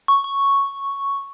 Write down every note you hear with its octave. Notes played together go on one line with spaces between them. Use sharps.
C#6
C#6